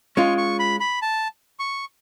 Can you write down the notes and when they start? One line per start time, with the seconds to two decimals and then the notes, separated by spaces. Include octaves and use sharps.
0.16 G#3 C#4 F4 C#6
0.38 C#6
0.59 B5
0.80 B5
1.02 A5
1.59 C#6